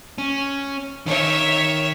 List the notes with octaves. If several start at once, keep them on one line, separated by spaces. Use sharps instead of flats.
C#4
D#3 C#5 E5